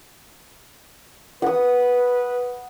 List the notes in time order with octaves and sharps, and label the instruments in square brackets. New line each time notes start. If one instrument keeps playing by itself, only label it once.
[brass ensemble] B4 [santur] F#5 D#6